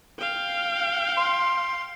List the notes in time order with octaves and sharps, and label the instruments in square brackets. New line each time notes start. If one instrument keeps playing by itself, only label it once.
[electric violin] F5 G5
[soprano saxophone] C6